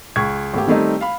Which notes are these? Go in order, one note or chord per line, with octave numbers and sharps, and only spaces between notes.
C#2 C#6 G#6
G#1 A3 G4
D#3 G3 A3 C4 D#4
F5 B5